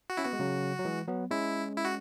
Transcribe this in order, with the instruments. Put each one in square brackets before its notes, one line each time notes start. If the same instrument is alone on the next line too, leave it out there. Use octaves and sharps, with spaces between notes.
[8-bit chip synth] F#4
[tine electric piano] C#4 [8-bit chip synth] E4
[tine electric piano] B3 [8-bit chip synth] F#4
[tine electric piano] G#3
C#3 F#3
F#3
E3 G#3
F#3 B3
[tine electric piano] G#3 C#4 [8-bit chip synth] E4
[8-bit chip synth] E4
F#4